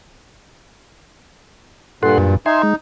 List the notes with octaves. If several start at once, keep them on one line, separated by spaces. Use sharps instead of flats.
G2 A#2 A4 F#5 C6
F#2
D#4 E5 G#5 C6
G#3